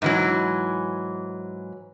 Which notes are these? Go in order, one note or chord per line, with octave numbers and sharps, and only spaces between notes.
G#2 E3 F#3